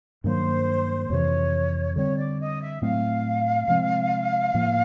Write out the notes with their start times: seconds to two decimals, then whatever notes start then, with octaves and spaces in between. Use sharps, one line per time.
0.24 G2 D#3 F#3 A#3 C5
1.09 F2 C3 E3 C#5
1.96 D3 G3 C4 C#5
2.18 D5
2.40 D#5
2.61 E5
2.82 A2 F#3 A3 C4 F5
3.68 C3 F3 G#3 C4
4.54 A2 F3 A#3